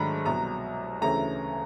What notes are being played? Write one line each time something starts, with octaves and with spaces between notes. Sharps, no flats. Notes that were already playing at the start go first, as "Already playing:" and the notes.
Already playing: G#2 D#3 F#3 A3 D4 A#5 B5
C2 B2 F#3 A#5
D2 C#3 E3 A3 C#4 A#5